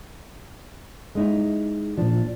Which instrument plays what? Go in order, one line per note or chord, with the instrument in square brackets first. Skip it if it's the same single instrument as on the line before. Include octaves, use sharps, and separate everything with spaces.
[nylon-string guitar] G#3 D#4 E4
[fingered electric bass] A#2 F3 [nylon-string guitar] D4